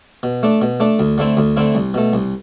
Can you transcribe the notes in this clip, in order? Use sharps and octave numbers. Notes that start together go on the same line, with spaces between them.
B2
A3 D4
B2
A3 D4
D2
D3 A3 C4 E4
D2
D3 A3 C4 E4
C2
B2 A3
C2